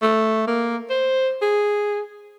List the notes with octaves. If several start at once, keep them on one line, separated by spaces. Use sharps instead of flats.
A3
A#3
C5
G#4